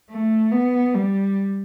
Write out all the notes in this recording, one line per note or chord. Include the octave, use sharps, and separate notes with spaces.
A3
B3
G3